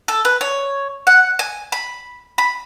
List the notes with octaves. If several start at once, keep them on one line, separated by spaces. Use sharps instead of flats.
A4
B4
C#5
F#5
G#5
B5
B5